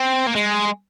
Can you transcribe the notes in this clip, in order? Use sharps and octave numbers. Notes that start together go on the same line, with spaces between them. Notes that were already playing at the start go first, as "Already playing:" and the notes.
Already playing: C4
A#3
G#3